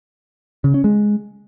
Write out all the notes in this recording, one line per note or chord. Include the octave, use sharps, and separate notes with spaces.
C#3
C#4
G#3